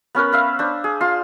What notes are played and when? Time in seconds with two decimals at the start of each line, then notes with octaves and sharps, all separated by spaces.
0.15 B3 C#4 A#4 B4
0.32 E5 F5 B5
0.59 D4 C5
0.84 G#4
1.01 F4 C6